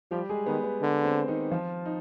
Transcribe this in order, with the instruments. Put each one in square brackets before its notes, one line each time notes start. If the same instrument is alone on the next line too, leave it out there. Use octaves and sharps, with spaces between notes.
[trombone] F3 [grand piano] G3 G4
[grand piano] G#3 G#4
[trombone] D#3 [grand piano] B3
[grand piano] B3
[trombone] D3 [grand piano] B3
[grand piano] C4
D#3 D#4
F3 F4
D#4